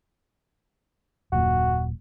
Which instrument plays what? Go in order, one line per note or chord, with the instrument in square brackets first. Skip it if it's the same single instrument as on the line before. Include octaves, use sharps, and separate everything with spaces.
[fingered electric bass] D#1 F#2 A#2 [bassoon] F#4